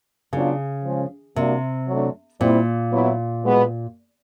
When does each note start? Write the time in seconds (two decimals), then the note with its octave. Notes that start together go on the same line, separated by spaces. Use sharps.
0.33 C#3 F#3 B3 D4 F4
0.85 F3 G#3 C#4
1.36 C3 G3 A#3 D4 F#4
1.88 F#3 A3 D4
2.40 A#2 G3 C4 E4
2.92 F#3 B3 E4
3.44 B2 G#3 B3